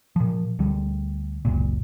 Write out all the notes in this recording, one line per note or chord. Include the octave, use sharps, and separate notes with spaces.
A#2 F3
D2 G3
F#1 C#2 A#2